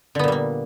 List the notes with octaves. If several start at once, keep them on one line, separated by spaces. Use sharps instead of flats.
A#2 D3 G3 A#3 B3